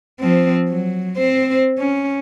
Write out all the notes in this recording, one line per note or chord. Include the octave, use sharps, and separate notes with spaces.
F3 C4
F#3
C4 C5
C#4